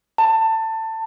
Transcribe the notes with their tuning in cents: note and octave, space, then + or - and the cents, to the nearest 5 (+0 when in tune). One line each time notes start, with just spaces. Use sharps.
A5 +20